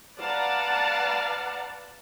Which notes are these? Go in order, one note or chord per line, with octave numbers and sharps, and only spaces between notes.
B4 D5 F5 F#5 A5 A#5